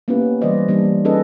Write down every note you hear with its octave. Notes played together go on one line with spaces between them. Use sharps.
A#3 B3 C#4 E4 G4 B4
E3 G3 B4 C5 D5 D#5
E3 G3 A#3 D4
C#4 D#4 G#4 A4 B4 D#5